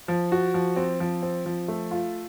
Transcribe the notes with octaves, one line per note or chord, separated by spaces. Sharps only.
F3
F#4
F3
C4
F3
C4
F3
A3
F4